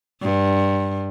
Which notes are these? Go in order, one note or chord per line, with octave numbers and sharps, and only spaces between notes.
G2